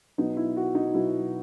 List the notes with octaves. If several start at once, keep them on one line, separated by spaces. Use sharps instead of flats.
B2 F#3 B3 D#4
E4
F#4
D#4
B2 F#3 B3 E4